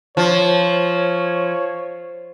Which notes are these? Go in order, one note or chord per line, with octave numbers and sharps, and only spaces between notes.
F3 C#5